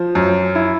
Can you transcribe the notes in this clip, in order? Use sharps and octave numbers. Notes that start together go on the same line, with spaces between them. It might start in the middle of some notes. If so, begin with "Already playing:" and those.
Already playing: F3
F#2
E4